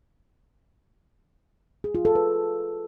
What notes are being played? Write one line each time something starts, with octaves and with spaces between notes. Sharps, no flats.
G#4
F4
A4
B4